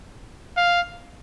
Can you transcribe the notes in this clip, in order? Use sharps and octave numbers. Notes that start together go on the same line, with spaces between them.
F5